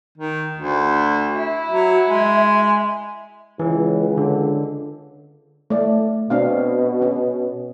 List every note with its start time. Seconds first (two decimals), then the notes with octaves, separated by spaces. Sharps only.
0.18 D#3
0.57 D2
1.35 E4
1.71 F#3
2.09 G#3
3.60 C#2 E3
4.17 D3
5.70 A3 D5
6.30 B2 C4 D4 F5
7.02 C#4